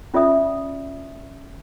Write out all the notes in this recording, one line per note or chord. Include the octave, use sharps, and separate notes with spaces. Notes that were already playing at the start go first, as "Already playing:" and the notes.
C#4 F4 D5 E5 D#6